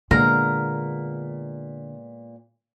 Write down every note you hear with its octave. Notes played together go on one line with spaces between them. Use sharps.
A#2 D3 G#3 B3 A#4